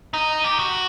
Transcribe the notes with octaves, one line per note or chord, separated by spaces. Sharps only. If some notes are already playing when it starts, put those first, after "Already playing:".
D#4
G4
F#4